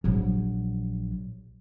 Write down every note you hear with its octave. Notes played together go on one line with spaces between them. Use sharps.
A#1 F#3